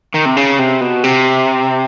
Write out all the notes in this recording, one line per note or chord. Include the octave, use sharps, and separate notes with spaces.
D#3
C3
C#3
C3
B2
C3